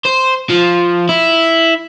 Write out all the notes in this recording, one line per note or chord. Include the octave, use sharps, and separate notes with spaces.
C5
F3
E4